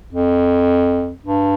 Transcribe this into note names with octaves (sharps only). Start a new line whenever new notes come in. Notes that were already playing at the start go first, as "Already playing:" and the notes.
F2
G2